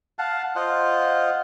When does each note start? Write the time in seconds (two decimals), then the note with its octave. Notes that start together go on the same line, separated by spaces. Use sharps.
0.19 F5 F#5 A5
0.56 F4 C5 D#5 F#5